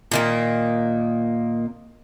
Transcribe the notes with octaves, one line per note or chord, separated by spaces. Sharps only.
A#2 D#3 A#3